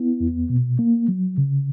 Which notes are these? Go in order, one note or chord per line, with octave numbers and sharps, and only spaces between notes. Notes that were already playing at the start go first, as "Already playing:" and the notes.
Already playing: B3 E4
E2
B2
A#3
F#3
C#3